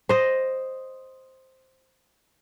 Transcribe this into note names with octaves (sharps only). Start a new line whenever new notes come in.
C5 D#5